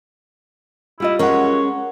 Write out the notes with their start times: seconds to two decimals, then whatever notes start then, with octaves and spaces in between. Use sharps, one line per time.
1.00 G3 E4 F4 D#5
1.19 G#3 C#4 A#4 C#5 F#5